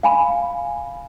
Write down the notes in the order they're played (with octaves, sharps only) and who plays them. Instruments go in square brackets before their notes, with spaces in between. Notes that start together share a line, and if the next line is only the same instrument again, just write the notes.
[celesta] F5 G#5 B5